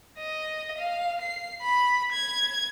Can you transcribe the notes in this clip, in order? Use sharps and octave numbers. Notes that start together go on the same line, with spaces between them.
D#5
F5
C7
B5
G#6